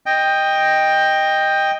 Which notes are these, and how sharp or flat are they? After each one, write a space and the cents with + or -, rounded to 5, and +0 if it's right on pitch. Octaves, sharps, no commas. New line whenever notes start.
D#5 +0 G5 +10